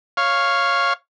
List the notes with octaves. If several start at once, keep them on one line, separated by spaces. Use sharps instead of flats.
C#5 F5